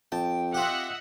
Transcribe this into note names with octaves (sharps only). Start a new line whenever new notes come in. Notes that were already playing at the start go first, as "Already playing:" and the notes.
F2 G5 A5
C4 F4 G4 D#5 E5 F#5